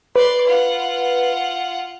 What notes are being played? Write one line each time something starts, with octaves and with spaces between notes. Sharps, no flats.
B4 D5 C6
F4 F#5